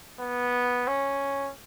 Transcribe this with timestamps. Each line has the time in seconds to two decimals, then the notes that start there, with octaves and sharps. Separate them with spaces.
0.20 B3
0.87 C#4